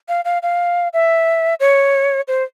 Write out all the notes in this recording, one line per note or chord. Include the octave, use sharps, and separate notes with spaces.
F5
F5
F5
E5
C#5
C5